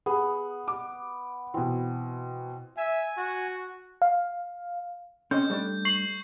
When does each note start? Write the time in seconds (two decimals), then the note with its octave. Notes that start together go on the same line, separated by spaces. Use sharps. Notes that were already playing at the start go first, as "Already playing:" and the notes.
0.06 B3 G#4
0.68 D6
1.54 B2 E3 C4
2.77 E5 G#5
3.18 F#4
4.02 F5
5.31 C4 C#4 D#5 G6
5.50 G3 A3 D4
5.85 C#6 C7 F#7